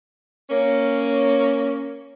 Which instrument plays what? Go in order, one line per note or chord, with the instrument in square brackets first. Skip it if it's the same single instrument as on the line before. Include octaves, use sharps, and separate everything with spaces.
[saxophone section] A#3 C#4